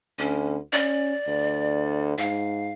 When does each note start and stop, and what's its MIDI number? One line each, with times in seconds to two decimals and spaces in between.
0.19 0.58 38
0.19 0.56 61
0.73 1.14 61
0.73 2.03 74
1.28 2.16 38
2.18 2.73 44
2.18 2.73 77